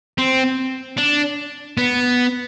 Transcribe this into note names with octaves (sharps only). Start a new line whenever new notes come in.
C4
D4
B3